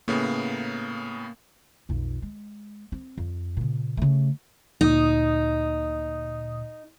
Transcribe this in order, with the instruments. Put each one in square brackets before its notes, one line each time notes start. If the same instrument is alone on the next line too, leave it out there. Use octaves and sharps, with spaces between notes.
[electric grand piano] A2 C#3 B3 [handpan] A#3
[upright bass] B1 F2
G#3
C4
F2
A#2 C#3
C#3 A3
[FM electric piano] D2 A#2 D#6 [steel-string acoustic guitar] D#4